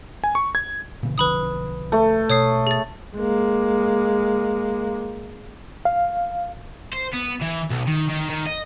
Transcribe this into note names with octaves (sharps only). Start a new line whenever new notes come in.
G#5
C#6
G#6
A#2 C#3 E3
B1 D3 F3 B4 B5 D#6
A3
B2 C#5 D#6 C7
G#4 A6
G#3 A#3
F5
C5
B3
E3
B1
D#3
D#3
D#3
D#5